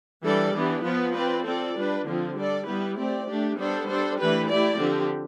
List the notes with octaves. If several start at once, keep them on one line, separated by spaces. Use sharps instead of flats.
E3 G3 D4 A4 D5
E3 B3 D4 G4
F3 B3 F4 B4
C4 F4 B4 D5
C4 F4 A4 D5
G3 D4 F4 B4
D3 F3 C4 F4
G3 D4 A4 D5
G3 B3 E4 G4 B4
A3 C4 G4 D5
A3 D4 G4
G3 B3 D4 A4 C5
G3 D4 A4 C5
E3 A3 D4 G4 B4
A3 E4 G4 D5
D3 F3 C4 G4